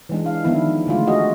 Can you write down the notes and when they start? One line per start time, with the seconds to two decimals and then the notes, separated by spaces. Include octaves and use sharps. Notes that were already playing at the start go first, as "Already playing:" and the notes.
0.09 E3 G#3 D4
0.26 F5
0.44 D#3 F3 B3 D4 E4
0.87 D3 G#3 A3 F4
1.07 F#4 G#4 D#5